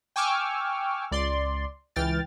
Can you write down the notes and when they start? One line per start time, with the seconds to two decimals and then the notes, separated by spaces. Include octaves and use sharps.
0.16 G5 G#5 C#6 D6 E6 F6
1.11 C#2 D5 C6
1.96 C#2 E3 G5 F6 A6